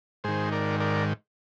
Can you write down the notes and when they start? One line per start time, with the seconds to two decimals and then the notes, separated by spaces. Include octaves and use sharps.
0.24 G#2 D#3 G#4 C5
0.52 A#4 D5
0.80 A#4 D5